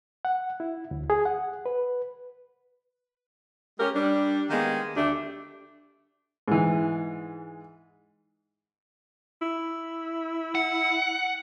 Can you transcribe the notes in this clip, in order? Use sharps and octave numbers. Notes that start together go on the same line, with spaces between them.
F#5
E4
D2
G#4
F#5
B4
G#3 C#4 G4 A#4
G3 D4
D#3 G#3 A#3 B3
D2 A3 D4 G4
G#2 E3
E4
F#5